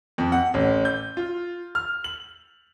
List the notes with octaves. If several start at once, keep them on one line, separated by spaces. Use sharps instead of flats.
F2
F#5
A1
G6
F4
F6
F#7